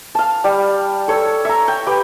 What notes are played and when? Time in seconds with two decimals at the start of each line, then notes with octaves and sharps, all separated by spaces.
0.15 F5 A5
0.44 G3
1.08 A4 C#5 E6
1.45 E5 A#5
1.68 G5
1.86 G4 B4 G5